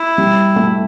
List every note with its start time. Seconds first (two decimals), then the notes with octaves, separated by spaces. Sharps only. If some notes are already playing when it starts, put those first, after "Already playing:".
Already playing: E4
0.18 G3
0.56 A3